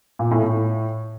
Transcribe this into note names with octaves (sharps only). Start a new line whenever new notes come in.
A#2
A2
A2